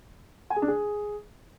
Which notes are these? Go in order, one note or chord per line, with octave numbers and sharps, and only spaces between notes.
G#5
G#4
D4
G#4